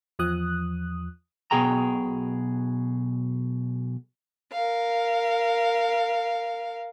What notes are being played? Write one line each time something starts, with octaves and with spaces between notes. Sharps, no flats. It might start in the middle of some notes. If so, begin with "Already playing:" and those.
E2 F3 D#6 F#6
B1 B2 G#4 G5 A#5
A#4 F5